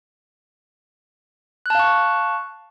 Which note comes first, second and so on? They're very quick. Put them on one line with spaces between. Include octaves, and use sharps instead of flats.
F#6 A5 F5 C#6